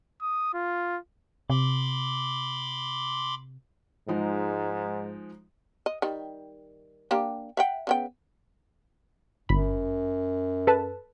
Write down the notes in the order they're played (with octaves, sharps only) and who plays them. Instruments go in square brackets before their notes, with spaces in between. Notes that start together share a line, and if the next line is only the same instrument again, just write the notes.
[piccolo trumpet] D#6
F4
[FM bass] C3 [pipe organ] B5 C6 D6
[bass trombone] G#2 [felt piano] F3 G#3 D#4
[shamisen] D#5
D#3 G3
A#3 D4 G4
E5 F#5 G5
C#3 B3 G5
[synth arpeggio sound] G1 B5 [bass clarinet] F#2
[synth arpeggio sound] A4 B4 A5